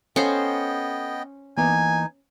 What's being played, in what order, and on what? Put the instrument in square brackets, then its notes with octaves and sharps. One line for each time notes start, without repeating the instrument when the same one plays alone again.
[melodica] B3 D#5 G5 [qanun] C#4 C5 [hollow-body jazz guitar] A4 F5
[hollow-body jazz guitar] E3 A#3 B3 [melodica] D#4 [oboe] G#5